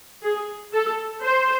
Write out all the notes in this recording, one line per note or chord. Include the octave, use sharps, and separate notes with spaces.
G#4
A4
C5